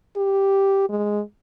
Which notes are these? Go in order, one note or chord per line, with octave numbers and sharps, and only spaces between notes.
G4
G#3